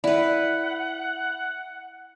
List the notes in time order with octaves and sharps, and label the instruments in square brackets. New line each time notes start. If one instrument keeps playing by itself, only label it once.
[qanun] E4 B4 [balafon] D5 [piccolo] F#5